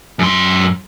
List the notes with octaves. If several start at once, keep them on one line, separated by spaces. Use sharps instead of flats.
F#2 C6